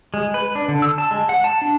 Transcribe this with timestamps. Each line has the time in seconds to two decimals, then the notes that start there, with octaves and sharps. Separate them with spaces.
0.14 G#3
0.34 B4
0.55 D4
0.68 D3
0.82 E6
0.98 A5
1.11 G#3
1.29 F#5
1.44 A5
1.62 D4